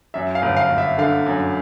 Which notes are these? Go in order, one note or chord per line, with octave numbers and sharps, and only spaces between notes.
F#2 E5
F5
G1
F5
G1
E5
D3 F5
F#2